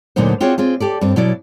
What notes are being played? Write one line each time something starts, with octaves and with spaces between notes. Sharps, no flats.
D2 A#2 D3 F#3 D#4 C5
C4 F4 F#4 G#4 C#5 D5
C4 F4 G#4
G4 A4 D5
G2 C4
B2 F#3 E4 D5